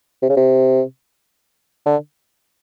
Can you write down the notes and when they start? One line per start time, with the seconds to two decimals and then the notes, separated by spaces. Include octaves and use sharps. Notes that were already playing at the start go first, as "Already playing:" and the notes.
0.22 C3
0.29 C#3
0.37 C3
1.86 D3